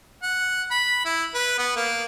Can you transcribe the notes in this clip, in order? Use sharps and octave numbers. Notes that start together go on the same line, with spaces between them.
F#5
B5
E4
B4
B3
A#3